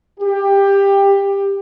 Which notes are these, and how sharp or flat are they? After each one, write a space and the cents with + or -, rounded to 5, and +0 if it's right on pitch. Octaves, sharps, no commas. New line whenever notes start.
G4 +15